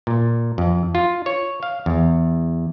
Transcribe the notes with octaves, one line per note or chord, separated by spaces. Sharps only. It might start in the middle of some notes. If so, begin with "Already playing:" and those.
A#2
F2
F4
C#5
F5
E2